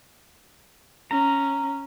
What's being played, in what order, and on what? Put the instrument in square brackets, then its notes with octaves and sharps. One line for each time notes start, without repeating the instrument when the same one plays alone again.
[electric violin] C#4 [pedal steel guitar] A#5